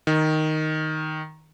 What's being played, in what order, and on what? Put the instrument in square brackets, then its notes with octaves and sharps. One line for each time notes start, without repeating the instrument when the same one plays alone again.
[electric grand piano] D#3